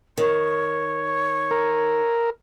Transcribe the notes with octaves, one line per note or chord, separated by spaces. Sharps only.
D#3 C#5
A#4